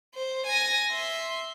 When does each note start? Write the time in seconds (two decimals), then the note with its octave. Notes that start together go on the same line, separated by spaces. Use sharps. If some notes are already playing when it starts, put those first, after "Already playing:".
0.14 C5
0.46 G#5 A#6
0.91 E5 C6